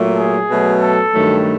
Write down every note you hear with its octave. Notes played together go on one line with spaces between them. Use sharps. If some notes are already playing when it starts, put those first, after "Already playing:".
Already playing: A#2 F#3 A3
G#4
B2 F#3 A3
A4
G2 D#3 F#3 A3